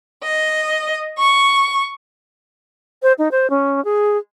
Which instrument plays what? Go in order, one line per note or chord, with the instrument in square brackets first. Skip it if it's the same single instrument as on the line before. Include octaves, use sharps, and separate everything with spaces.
[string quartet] D#5
C#6
[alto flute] C5
D#4
C5
C#4
G#4